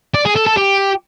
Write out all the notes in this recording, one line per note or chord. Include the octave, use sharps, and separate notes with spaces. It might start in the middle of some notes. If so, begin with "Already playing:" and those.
D5
G#4
A4
A4
G4